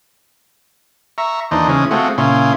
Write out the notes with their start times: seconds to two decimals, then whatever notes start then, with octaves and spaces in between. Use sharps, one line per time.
1.18 E5 A#5 C#6
1.51 D#2 E3 D4 D#4 C5
1.69 C#3 E3 G#3 C#4
1.91 G#3 A3 C4 F4 F#4
2.18 A#2 C#3 C#4 E4 F4 C6